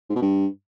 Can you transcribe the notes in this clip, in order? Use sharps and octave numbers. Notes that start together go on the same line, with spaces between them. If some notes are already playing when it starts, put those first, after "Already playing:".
G#2
B2
G2